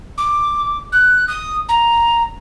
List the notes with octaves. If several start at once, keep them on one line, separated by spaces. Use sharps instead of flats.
D6
F#6
D#6
A#5